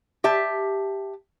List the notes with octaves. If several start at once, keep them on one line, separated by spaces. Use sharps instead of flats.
G4 E5 A5